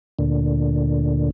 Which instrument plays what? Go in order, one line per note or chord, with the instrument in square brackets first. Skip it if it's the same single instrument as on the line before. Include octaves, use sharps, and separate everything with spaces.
[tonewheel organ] D2 A#2 D3